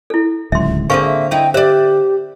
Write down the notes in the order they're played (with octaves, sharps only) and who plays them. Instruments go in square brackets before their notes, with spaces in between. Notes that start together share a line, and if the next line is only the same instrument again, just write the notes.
[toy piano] E4 A4
[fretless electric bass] D1 C#2 F#3 [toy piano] E5 C6
[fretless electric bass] D3 [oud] A#3 C4 G#4 [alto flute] C5 [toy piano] F5 C#6
[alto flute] E5
[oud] D#4 E4 [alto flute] G5
[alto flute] G4 [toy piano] C5 [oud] D5 E5